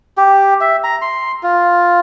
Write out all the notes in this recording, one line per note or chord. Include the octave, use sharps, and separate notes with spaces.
G4
E5
A#5
C6
F4